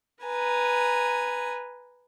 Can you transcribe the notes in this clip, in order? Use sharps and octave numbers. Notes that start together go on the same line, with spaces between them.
B4 G#5 A#5